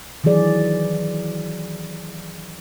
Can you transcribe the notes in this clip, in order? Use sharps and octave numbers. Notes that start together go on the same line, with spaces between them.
D#3 E3 F#3 G#4 D5